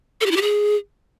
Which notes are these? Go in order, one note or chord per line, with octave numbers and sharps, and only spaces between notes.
A4
G4
E4
G4
G#4